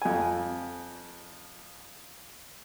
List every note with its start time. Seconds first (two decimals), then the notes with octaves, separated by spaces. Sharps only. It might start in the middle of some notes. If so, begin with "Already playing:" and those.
0.02 F2 G#5